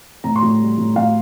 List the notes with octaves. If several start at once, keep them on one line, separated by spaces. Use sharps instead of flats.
A2 A#5
C6
A2
G3
A2
A2 F5